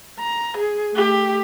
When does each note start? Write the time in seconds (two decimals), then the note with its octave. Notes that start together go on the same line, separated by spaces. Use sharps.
0.19 A#5
0.57 G#4
0.93 A3 G4